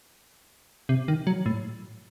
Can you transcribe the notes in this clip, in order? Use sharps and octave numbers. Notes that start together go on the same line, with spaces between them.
C3
D#3
F#3
A2